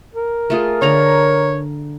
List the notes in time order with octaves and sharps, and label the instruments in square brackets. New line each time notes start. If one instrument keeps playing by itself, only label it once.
[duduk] A#4
[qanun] A3 F4 G#4
[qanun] D3 A#5 [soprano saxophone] C#5